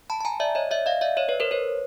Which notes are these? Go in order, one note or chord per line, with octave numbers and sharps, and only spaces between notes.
A5 B5
A5
G#5 A#5
D5 E5
C#5 D#5
D5 E5
D#5 F5
D5 E5
C#5 D#5
B4 C#5
A#4 C5
B4 C#5